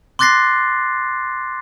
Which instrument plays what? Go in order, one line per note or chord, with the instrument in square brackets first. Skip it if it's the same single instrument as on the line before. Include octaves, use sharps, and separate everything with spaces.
[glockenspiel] C6 D6 F#6 A6 A#6 C7